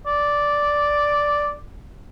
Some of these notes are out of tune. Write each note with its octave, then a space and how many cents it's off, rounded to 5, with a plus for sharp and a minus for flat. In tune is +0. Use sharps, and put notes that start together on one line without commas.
D5 -5